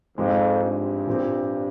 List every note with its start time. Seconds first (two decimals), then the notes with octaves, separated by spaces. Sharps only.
0.18 F2 G#2 F3 G#3 C4 G4
0.62 G2
1.07 A#2 F3 C4 G4